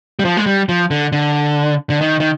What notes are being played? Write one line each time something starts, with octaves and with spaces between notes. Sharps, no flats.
G3
F3
G#3
G3
F3
D3
D3
D3
D#3
D#3